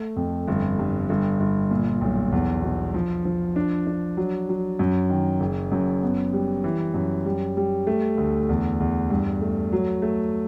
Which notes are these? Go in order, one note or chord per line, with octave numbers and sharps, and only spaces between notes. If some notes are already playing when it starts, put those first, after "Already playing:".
Already playing: A3
F2
G1
G2
G1
G1
A#2
B1
E2
B2
F3
F3
D4
D4
F#3
F#3
F#2
D#3
F#1
F#2
B3
G3
E3
F#2
G3
G3
A3
D2
E2
E2
G2
A3
F#3
A3